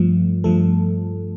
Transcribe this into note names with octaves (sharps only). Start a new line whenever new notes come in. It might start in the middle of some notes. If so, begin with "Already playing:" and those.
Already playing: G2 F3 A3
G2 F3 A3 A4